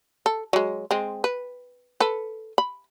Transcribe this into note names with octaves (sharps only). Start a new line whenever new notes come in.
A4
F#3 G#3
G#3 C4
B4
A4 B4
B5